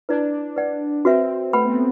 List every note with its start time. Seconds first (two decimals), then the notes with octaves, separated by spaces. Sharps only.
0.09 D4 E4 B4 D5
0.56 B4 D5 F#5
1.05 C4 F#4 B4 E5
1.53 A3 B4 F#5 B5
1.65 B3
1.69 C4